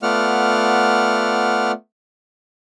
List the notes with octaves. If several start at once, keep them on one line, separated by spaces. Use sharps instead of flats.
A3 B3 F4 D5 F#5 F6